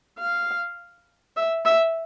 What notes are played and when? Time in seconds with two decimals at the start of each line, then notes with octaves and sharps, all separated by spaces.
0.19 F5
1.36 E5
1.65 E5